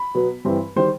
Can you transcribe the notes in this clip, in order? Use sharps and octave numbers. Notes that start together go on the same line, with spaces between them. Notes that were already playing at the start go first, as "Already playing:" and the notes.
Already playing: B5
B2 F#3 B3
G2 E3 G3 C4
D#3 G3 C5